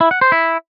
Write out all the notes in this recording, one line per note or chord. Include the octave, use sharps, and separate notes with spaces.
E4
F#5
C5
E4